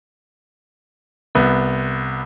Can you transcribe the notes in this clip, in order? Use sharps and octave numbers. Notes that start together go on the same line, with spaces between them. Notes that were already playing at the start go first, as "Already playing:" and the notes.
C2 B3